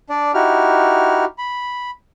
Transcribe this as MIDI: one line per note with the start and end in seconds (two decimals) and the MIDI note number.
0.10 0.32 62
0.10 0.32 74
0.34 1.25 63
0.34 1.25 64
0.34 1.25 66
0.34 1.25 67
0.34 1.25 89
1.38 1.90 83